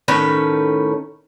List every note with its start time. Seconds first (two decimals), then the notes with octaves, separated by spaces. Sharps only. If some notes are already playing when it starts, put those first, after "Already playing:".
0.08 A2 D#3 C#4 B4